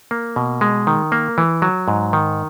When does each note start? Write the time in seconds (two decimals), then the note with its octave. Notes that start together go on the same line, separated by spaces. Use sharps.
0.11 A#3
0.36 B2
0.61 G#3
0.87 D#3
1.12 A#3
1.38 E3
1.62 F#3
1.88 G#2
2.13 D#3